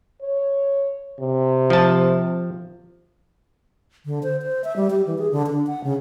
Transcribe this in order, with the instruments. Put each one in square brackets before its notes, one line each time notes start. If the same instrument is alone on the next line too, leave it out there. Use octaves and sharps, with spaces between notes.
[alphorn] C#5
C3
[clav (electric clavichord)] F3 A5
[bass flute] D3
C5
C5
E5
G3
G4
E3
G#4
D3
D4
F#5
C#3